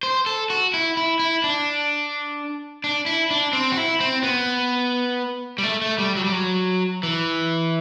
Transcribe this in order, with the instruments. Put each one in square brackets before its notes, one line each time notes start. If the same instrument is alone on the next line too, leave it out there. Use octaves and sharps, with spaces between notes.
[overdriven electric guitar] C5
A4
F#4
E4
E4
E4
D4
D4
E4
D4
C4
F#4
E4
C4
B3
G3
A3
A3
G3
F#3
G3
F#3
E3